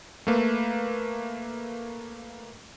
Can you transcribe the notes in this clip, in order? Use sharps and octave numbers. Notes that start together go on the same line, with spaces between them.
A3 A#3 B4